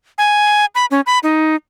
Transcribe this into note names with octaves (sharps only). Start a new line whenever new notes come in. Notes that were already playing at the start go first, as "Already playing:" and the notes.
G#5
B5
C#4
B5
D#4